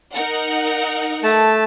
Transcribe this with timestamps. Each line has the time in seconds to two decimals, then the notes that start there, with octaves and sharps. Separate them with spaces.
0.14 D#4 A#4 F#5
1.23 A3 A5